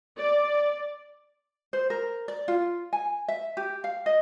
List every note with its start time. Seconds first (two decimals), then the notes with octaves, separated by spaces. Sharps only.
0.17 D5
1.73 C5
1.90 A#4
2.28 D5
2.48 F4
2.93 G#5
3.28 E5
3.57 G4
3.84 F5
4.06 D#5